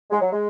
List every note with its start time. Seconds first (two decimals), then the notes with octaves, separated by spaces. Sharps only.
0.11 G#3
0.21 F#3
0.33 G#3